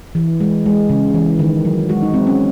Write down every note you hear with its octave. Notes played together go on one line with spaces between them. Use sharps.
E3
G#3
G#3
C#3
E3
D#3
F#3
G#3 F#4
D#4
G#3 C4
C#4